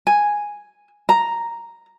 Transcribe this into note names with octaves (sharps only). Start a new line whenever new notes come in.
G#5
A#5